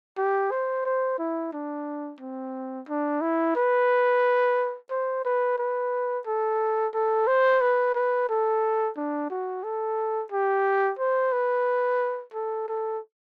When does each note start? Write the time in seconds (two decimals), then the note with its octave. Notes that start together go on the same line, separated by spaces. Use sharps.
0.17 G4
0.51 C5
0.85 C5
1.19 E4
1.53 D4
2.20 C4
2.89 D4
3.21 E4
3.56 B4
4.90 C5
5.25 B4
5.58 B4
6.27 A4
6.94 A4
7.27 C5
7.61 B4
7.95 B4
8.29 A4
8.97 D4
9.30 F#4
9.63 A4
10.32 G4
10.99 C5
11.33 B4
12.34 A4
12.68 A4